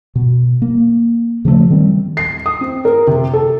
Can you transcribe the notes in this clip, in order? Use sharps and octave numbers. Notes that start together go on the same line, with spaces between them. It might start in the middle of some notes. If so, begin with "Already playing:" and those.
B2
A#3
C#3 F3 G#3 A3
D#3 G3 C4
C7
D#6
C4
A#4
C3
A4